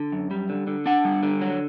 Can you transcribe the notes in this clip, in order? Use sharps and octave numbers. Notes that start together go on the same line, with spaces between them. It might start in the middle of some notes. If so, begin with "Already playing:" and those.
Already playing: D3
F#2
G3
D3
D3
D4 F#5
G3
D3
F#3